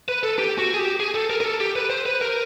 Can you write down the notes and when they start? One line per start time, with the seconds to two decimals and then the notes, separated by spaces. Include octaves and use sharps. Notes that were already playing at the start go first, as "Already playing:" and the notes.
0.08 B4
0.23 A4
0.39 G4
0.59 F#4
0.74 G#4
0.79 G4
1.00 G#4
1.14 A4
1.30 A#4
1.41 A#4
1.44 A4
1.60 G4
1.76 B4
1.90 C5
2.06 B4
2.21 A#4